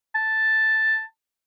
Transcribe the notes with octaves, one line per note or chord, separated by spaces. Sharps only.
A5